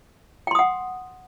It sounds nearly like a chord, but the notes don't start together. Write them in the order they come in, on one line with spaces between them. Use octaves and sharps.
G5 C6 D#6 F#5